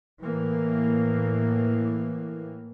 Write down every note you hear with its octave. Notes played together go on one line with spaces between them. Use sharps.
A2 E3 A#3